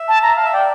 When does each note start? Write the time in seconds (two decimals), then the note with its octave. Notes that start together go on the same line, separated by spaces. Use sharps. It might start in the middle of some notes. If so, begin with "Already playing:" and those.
Already playing: E5
0.08 A5
0.23 A#5
0.36 F5 A5
0.45 E5
0.53 D5 G5